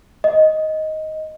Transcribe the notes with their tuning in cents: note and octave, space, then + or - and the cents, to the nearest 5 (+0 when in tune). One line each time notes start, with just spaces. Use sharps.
D#5 +10